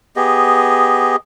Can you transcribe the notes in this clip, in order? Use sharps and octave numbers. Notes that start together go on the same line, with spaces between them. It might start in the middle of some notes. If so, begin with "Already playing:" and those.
B3 G4 G#4 D#5